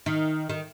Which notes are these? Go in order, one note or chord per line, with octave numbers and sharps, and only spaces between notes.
D#3
D#3